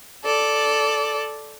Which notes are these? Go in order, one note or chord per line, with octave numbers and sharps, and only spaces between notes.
A4 D5